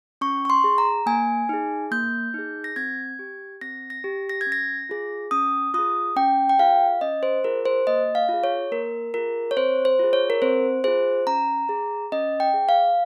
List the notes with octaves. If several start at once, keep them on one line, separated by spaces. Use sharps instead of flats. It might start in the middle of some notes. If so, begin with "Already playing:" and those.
C#4 C#6
C#6
C6
G#4
A#5
A#3 G#5
D#4 G#4
A#3 G6
D#4 G#4
A#6
C4 G#6
G4
C4 A#6
A#6
G4
A#6
G#6
C#4
A#6
F4 G#4
C#4 D#6
F4 G#4 D#6
C#4 G5
G5
F4 G#4 F5
C#4 D#5
C5
F4 G#4 A#4
C5
A#3 D#5
F5
F4 G#4
C#5
A#3 A#4
F4 G#4 A#4
C#5
C4 C5
C5
F4 G#4
C#5
A#4
C4 C5
F4 G#4 C5
C#4 A#5
G#4
C#4 D#5
G5
G#4
F5